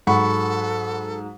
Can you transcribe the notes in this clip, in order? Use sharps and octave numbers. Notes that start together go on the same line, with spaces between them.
G#2 F#3 A4 F#5 B5 C#6